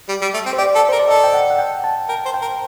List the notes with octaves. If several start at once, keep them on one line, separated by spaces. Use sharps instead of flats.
G3
G3
A3
C4
C5
G4 D5
A4
A#4 C5
D5
A4 D#5
G5
F#5
F#5
G5
A5
A#4 G5
C5
G5
A#4